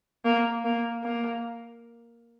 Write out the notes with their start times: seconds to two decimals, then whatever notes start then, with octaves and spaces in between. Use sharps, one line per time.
0.25 A#3
0.65 A#3
1.03 A#3